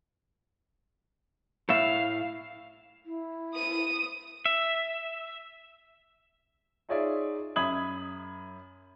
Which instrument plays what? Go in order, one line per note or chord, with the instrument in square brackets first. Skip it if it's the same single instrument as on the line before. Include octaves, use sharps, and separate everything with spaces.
[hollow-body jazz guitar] A2 A3 E5 [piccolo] F5
[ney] E4
[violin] D#6 D#7
[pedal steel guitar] E5
[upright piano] D#4 F4 G#4 C#5 D5 E5
F#2 E5 B5 D#6 G#6 F#7